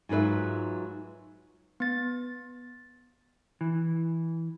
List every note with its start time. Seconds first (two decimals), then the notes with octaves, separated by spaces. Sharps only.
0.09 G#2 F#3 F4 B4 E5
1.80 B3 A6
3.61 E3